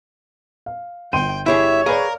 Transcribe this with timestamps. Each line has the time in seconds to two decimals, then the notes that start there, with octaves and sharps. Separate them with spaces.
0.66 F5
1.13 G1 G5 C6 D#7
1.46 E4 G4 G#4 C#5 E5
1.86 G#4 A#4 B4 D5 F5